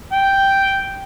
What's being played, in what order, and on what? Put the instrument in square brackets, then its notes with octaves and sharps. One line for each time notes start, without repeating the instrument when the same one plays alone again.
[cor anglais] G5